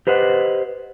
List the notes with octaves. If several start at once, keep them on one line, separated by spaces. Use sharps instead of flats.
G4 B4 C5 D#5 F#5